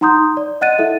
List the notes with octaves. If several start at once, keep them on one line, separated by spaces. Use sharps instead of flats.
D#4 F#5 A#5 C6 D#6 G6
D5
D#5 F#5 F#6 A6 D#7
E4 A4 E5 F#5